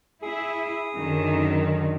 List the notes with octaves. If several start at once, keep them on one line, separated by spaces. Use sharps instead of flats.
E4 G#4
F#2 D3 D#3